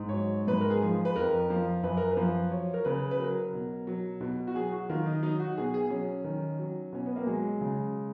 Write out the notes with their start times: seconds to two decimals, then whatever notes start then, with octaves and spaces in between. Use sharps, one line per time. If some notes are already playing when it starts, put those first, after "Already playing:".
Already playing: G#2
0.09 F#3 C#5
0.47 G#2 B4
0.61 A#4
0.70 G#4
0.82 F3
0.94 G#4
1.05 B4
1.16 F2 A#4
1.50 F3
1.83 F#2 B4
1.97 A#4
2.11 B4
2.17 F3
2.51 F#3 C#5
2.74 A#4
2.85 C#3 B4
3.11 B4
3.19 F#3 A#4
3.54 B2
3.87 F#3
4.21 B2
4.47 F#4
4.54 F#3 G#4
4.72 F#4
4.89 D#3 F4
5.06 D#4
5.23 F#3 D#4
5.40 F#4
5.57 B2 G#4
5.74 G#4
5.90 F#3 C#4
6.24 D#3
6.59 F#3
6.93 B2 C#4
7.06 B3
7.16 A#3
7.27 F#3 G#3
7.61 C#3